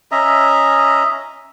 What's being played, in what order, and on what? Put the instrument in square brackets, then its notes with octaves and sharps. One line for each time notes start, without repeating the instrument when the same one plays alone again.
[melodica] C#4 D#5 E5 A#5